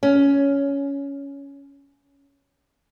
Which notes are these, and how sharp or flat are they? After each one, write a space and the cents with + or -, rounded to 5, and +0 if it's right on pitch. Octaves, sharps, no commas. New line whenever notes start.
C#4 +10